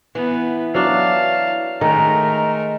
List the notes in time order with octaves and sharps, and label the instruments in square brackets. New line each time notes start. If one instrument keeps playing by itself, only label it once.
[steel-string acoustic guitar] E3 [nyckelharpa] B3
[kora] F#3 D4 [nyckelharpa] F5 A5
[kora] D#3 [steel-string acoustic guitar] G#3 [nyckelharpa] A3 A#4 [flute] A#5